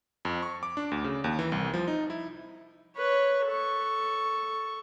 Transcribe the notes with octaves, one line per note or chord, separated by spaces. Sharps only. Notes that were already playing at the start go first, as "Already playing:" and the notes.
F2
C#6
D6
D4
D2
C#3
D#2
E3
C2
F3
D#4
E4
B4 C#5
A4 C#6